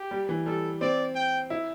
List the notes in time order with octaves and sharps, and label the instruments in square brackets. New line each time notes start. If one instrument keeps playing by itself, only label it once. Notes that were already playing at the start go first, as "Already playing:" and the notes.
Already playing: [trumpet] G4
[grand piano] G3
E3
[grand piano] G3 [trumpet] A4
[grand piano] C4 [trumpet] D5
[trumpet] G5
[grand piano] E4